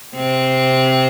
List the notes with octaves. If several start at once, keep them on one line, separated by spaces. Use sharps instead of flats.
C3 C4